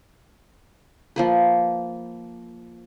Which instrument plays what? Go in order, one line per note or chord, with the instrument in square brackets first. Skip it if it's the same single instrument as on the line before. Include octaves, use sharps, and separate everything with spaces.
[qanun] F3 A#3 B4